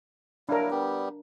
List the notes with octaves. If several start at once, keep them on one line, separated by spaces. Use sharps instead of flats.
F#3 A#3 D4 E4 A#4
G3 B3 G4